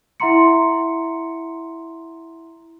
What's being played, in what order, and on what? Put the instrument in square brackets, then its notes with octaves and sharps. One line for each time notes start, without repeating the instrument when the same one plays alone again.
[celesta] E4 E5 F#5 A#5 C6 C#7